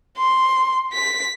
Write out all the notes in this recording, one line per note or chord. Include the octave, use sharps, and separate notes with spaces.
C6
B6